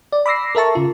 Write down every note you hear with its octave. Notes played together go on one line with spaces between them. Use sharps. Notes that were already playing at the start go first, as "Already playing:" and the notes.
D5
B5 D6 E6 A#6 C7
A4 A#4 E5 A5 C#6
C#3 F4